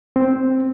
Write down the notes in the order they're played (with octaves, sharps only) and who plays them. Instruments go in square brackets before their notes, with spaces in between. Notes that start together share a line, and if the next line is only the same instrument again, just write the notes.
[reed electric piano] C4